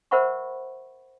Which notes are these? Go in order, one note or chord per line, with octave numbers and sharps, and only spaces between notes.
A#4 C5 E5 F#5 B5 C#6